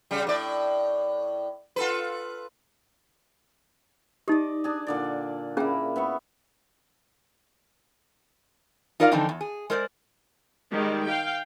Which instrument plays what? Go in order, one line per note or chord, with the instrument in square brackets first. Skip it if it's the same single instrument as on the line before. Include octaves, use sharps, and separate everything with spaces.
[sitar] C#3 G3
A2 D5
F4 A4 B4
[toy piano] D#4 G4 [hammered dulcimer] D5 D#5
[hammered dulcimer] D4 G#4
A#2 D3 D5
[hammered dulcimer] A#3 E4 [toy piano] C#4 G#4 G5
[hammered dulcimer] B3 E5 C#6
[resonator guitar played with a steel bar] D#4 F4 A#4 D5 E5 F5
D3 E3 F3 C4 D4 D#4
E2
G#4
G#3 A#4 C5 D5
[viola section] D#3 G3 G#3
F5 G5